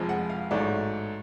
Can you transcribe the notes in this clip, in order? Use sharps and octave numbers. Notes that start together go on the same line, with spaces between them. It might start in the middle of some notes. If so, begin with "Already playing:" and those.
Already playing: F1 F2 F3 G#3
F#5
F5
A1 G#2 F#3 A3 D5